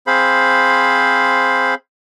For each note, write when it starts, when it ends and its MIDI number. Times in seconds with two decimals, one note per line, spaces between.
0.07 1.74 60
0.07 1.74 68
0.07 1.74 72
0.07 1.74 77
0.07 1.74 83